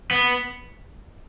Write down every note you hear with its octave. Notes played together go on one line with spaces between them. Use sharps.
B3